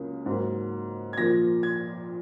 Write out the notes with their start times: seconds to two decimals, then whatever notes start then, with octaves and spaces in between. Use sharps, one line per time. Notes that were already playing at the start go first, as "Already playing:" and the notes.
Already playing: C#2 C#3 F#3 A#3
0.26 G#2 F#3 A#3
1.13 G#6
1.18 A#2 F3 A#3 A#6
1.63 G#6